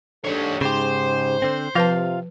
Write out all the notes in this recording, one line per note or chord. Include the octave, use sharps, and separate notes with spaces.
G#2 D4 G4 A4 C#5
G#2 C#3 G4 C5
D3 C4
C3 F3 F4 B4 F5 A5